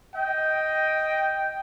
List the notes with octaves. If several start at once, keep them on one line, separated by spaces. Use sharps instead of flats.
D#5 G5